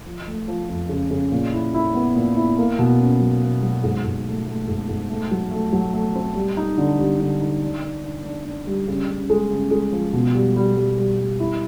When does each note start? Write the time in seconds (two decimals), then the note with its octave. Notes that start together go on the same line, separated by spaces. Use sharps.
0.06 F3
0.27 A3
0.48 F3
0.69 F2
0.89 C#3
1.11 C#3
1.32 A#2
1.53 E4
1.74 E4
1.94 B3
2.16 A#2
2.36 E4
2.58 A#3
2.79 B2
3.00 C#4
3.20 F#3
3.42 A#3
3.63 F#3
3.84 G#2
4.04 G#2
4.26 A3
4.46 A3
4.68 G#2
4.89 G#2
5.10 A3
5.31 F#3
5.51 A3
5.73 F#3
5.93 A3
6.15 C4
6.35 G3
6.57 D#4
6.78 D3
6.99 G3
7.20 D3
7.41 D#4
7.62 D4
7.83 D4
8.04 D4
8.25 D4
8.45 D4
8.67 G3
8.87 C#3
9.09 C#3
9.30 G#3
9.51 C#3
9.71 G#3
9.92 F3
10.13 B2
10.34 G3
10.56 G3
10.77 G3
10.97 G3
11.19 G3
11.40 E4